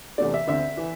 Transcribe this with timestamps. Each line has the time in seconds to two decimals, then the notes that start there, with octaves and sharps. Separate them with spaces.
0.18 E2 C3 A3 D4 D5
0.34 E5
0.48 D2 D3 C4 E5
0.77 E3